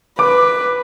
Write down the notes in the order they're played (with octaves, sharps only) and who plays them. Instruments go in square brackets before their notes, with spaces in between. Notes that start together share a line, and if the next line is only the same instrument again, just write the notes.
[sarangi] B4 [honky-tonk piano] D6